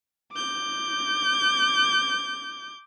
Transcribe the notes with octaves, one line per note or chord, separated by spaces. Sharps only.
D6 G6